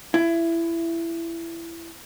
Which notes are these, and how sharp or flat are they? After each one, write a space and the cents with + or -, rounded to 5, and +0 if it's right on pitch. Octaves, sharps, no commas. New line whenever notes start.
E4 +20